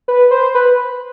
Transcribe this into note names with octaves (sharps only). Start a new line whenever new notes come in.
B4
C5
B4